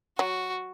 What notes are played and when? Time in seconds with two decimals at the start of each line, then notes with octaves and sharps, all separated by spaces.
0.19 F#3 F#4